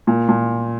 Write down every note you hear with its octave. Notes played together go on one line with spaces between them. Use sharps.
A#2
A#2